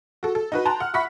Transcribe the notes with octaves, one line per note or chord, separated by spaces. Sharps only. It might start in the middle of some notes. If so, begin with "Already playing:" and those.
F#4 A4
A4
D#4 F#4 B4
G5 A5 A#5 C6 F#6
F#5 F6
E5 F#5 B5 C#6 B6